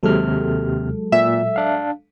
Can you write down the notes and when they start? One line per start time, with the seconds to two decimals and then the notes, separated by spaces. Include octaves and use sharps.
0.03 D#2 C3 F#3 G#3 A4 F6
1.12 A#2 E5
1.56 D4 F5